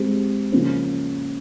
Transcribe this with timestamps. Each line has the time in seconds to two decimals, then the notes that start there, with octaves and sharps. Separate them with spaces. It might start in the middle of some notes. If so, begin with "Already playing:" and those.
Already playing: G#3 C4 G4
0.52 C#3 F3 A#3 C#4